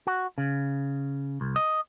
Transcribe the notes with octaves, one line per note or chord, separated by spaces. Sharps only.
F#4
C#3
C2
D#5